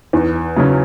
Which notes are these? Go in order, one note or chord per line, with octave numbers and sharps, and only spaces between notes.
E2
C#3 F#3 C#4